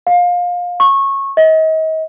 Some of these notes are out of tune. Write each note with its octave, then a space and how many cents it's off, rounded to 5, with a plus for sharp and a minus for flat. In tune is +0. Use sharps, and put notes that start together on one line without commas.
F5 +25
C#6 -20
D#5 +35